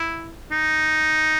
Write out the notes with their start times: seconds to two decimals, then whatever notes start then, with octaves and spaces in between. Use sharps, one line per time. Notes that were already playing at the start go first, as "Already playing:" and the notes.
Already playing: E4
0.52 D#4